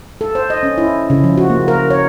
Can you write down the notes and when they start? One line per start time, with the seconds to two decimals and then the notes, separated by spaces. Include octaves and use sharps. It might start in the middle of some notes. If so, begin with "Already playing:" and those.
0.21 A4
0.35 C5
0.50 D#5
0.63 C#4
0.78 E4
1.10 C#3
1.24 F3
1.38 F#4
1.50 A#3
1.68 A#4
1.90 C#5